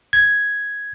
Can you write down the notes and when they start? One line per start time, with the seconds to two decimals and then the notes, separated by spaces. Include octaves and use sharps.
0.13 G#6